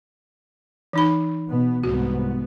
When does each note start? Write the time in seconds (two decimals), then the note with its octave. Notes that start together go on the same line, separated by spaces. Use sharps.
0.93 E3 D#4 B5
1.48 B2 B3
1.83 C2 G#2 B3 F#4